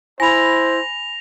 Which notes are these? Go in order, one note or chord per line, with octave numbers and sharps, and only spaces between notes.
E4 C5 G#5 B5 A#6 F7